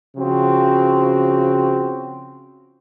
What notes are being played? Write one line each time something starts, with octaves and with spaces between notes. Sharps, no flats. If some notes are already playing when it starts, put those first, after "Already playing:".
C#3 F3 C4 F#4